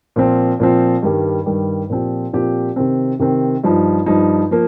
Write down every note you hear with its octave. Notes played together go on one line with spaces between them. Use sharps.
A#2 F3 C4
A#2 F3 C4
G2 D#3 G3
G2 D#3 G3
A#2 F3 C4 G4
A#2 F3 C4 G4
C3 D#3 C4
C3 D#3 C4
G2 F3 D#4
G2 F3 D#4
F3 A#3